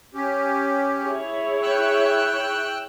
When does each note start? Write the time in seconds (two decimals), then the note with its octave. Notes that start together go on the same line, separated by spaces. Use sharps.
0.14 C#4 G4
1.01 E4 G#4 C#5
1.63 G5 E6 F#6